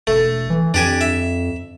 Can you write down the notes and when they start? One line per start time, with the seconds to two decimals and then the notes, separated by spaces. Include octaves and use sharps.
0.07 E1 A3
0.50 E3
0.74 F2 D4 G4 G#5
1.01 E5